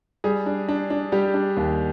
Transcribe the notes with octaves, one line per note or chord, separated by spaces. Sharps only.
G3 G#4
D4
D4
D4
G3 G4
D4
D#2